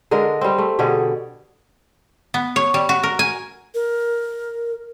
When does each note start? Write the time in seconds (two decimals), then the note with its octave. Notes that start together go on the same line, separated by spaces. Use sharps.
0.11 D3 G#3 D4 A#4
0.41 G3 C4
0.58 A3
0.79 B2 D3 G4 G#4
2.34 B3
2.56 C#5
2.74 G3
2.89 F#4
3.03 A#4
3.19 G#5
3.75 A#4